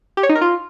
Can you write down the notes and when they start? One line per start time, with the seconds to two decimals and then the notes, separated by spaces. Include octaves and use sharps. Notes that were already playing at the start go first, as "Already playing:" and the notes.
0.17 G4
0.23 C#5
0.29 D#4
0.35 A#4
0.41 F4